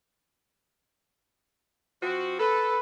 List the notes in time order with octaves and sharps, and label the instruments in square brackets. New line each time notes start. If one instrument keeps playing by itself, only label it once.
[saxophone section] F3 C4 F#4
[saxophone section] A4 [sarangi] B4